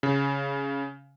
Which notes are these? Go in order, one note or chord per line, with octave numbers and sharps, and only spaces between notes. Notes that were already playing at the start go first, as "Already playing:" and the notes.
C#3